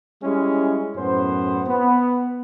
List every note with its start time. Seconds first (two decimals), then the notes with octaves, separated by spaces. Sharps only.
0.23 G3 G#3 C#4 E4 G#4
0.96 F#2 A2 B3 C5
1.66 B3